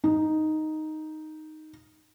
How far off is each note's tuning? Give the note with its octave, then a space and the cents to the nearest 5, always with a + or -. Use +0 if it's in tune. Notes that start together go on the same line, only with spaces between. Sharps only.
D#4 +0